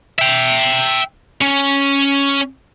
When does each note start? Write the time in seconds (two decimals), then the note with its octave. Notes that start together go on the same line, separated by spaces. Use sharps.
0.19 E5 G5
1.42 C#4